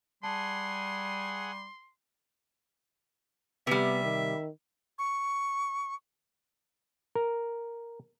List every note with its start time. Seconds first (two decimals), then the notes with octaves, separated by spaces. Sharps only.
0.23 G3 G#4 F#5 G#5 A5 C6
3.67 C3 G3 B3 E5
4.04 D#3
4.99 C#6
7.15 A#4